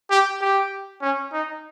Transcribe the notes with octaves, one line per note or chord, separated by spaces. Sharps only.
G4
G4
C#4
D#4